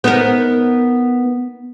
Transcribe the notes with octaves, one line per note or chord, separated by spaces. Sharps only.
B3 D#4 A#4